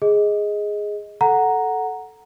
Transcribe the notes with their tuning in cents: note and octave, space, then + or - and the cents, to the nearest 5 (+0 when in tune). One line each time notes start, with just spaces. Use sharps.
G#4 +0 D#5 +10
A4 -5 F#5 +0 A#5 +0